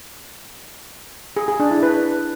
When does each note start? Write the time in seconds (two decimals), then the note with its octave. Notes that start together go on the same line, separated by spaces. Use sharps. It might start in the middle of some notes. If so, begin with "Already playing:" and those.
1.37 G#4
1.48 G#4
1.60 D4
1.71 E4
1.83 B4